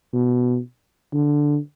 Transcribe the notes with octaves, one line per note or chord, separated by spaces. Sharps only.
B2
D3